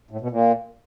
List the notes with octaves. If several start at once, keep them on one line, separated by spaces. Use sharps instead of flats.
A2
B2
A#2